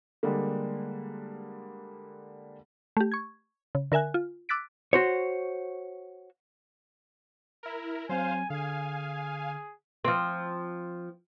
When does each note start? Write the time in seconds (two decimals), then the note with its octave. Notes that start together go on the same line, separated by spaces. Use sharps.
0.23 D3 G3 G#3 A#3
2.97 A3 G4
3.12 C#6 G#6
3.75 C#3
3.92 D3 A#4 E5 G#5 F#6
4.14 F4
4.49 D6 E6 F#6 A6 B6 D7
4.93 F#4 C5 C#5
7.63 E4 A#4
8.09 F#3 C4 C5 F5 G#5
8.50 D3 G#4 F5 G#5
10.05 F3 C4